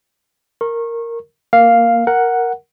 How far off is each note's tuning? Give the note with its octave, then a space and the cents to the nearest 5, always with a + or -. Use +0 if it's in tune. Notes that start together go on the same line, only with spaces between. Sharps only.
A#4 -10 C#6 -30
A#3 +0 F5 +0
A#4 +0 F#5 +0